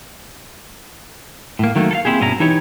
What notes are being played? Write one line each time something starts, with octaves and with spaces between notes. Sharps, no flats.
A2 A#3
D#3 F#3 A3 A#3
A4 F5
A#3 C4 D4 E4 G4 G#4
G2 B2 C#4 E4 B4 A#5
E3 D#4 E4 G4 C#5